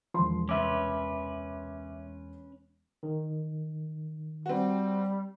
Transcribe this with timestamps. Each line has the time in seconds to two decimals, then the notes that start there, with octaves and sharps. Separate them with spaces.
0.14 E1 F3 C6
0.49 C2 C#4 B4 E5 D6
3.03 D#3
4.46 G3 C4 F#4